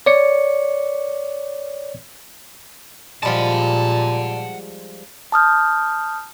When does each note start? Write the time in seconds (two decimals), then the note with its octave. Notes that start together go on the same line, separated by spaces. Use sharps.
0.06 C#5 D5 C#7
3.23 A#2 F3 G3 G#3 F#5 A5
5.32 A5 D#6 F6 G6